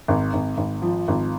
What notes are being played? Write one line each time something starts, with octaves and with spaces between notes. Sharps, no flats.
G#1
G#1
G#1
F3
G#1